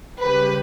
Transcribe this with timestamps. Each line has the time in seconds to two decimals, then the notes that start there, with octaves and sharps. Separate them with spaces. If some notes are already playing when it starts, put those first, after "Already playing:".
0.21 C#3 G3 C#4 G4 B4